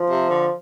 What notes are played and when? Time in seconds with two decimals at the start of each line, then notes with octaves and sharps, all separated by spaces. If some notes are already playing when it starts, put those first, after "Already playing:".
Already playing: F3
0.10 C3
0.29 D3